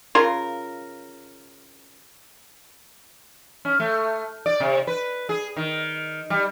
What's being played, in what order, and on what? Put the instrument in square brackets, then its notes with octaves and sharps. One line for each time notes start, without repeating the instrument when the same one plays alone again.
[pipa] C#3 F4 A#4
[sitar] C#4
A3
D5
C3
B4
G#4
D#3
G3